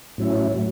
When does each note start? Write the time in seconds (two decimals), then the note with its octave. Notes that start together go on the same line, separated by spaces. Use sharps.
0.18 A2 F#3 C#4 E4
0.55 A2 F#3